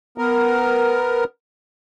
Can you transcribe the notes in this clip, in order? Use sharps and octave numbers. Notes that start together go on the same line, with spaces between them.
B3 A#4